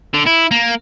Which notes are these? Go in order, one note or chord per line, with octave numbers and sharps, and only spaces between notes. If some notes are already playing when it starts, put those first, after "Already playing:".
D3
E4
A#3